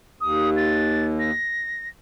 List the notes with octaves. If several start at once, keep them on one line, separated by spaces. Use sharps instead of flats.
D#2 D#6
A6
A#6